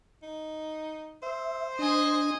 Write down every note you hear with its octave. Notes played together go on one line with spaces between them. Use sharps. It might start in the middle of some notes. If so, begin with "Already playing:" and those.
D#4
C5 E5
D4 D#5 G#5